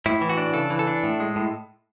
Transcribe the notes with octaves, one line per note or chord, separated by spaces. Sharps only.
A2 E4
E3
F#4
D4
C#3 A4
E3
A4
D4
A2
G#3
A2